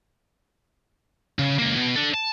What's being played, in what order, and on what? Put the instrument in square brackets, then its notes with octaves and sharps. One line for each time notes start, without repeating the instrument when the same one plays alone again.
[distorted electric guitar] C#3
C#2 A#3
B2
D4 A4
A5